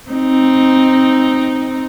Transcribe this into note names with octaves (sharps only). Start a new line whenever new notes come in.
C4 D#4